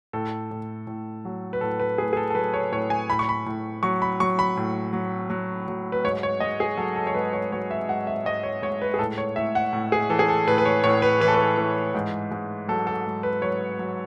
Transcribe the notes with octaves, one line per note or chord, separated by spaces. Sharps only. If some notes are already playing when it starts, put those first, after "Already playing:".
A2 A4
A2
A2
F#3
B4
A2 A4
B4
A2 G#4
G#4
A4
A4
F#3 B4
C#5
A2 C#5
G#5
A2 B5
C#6
B5
A2
F#3 C#6
B5
F#3 C#6
B5
A2
F#3
F#3
F#3
B4
G#2 C#5
C#5
G#2 D#5
G#4
F#3 A4
A4
C#5
G#2 B4
C#5
F#3 C#5
E5
G#2 F#5
E5
G#2 D#5
C#5
G#2 C#5
B4
G#4
A2 A4
C#5
A2 E5
F#5
A2
G#4
E3 A4
G#4
A4
A2 B4
B4
C#5
A2 C#5
B4
E3 B4
A4
B4
E3
G#2
G#2
F#3 A4
A4
G#2
B4
F#3 C#5
F#3